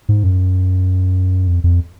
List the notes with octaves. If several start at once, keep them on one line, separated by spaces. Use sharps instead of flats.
G#2
F#2
F2
F2